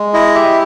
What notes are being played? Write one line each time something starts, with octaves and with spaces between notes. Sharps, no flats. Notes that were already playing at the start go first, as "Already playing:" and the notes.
Already playing: G#3
E4 D#5
G4 E5